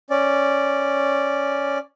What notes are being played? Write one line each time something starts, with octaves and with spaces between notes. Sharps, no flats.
C#4 D5